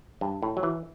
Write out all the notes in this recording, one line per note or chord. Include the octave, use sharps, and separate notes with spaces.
G2
A2
F#3
E3